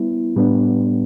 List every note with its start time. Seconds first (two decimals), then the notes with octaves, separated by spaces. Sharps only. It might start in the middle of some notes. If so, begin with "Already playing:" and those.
Already playing: G3 B3 E4
0.36 A2 G3 B3 D4